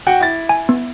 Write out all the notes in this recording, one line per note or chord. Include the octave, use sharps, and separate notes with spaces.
F#4 F#5 G5
E4 A6
G#5
B3